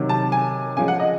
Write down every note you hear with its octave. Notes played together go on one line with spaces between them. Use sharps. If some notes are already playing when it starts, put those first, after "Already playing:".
Already playing: C3 D#3 F#3
A5
G#5
C#3 F3 G#3 G#5
F#5
D#5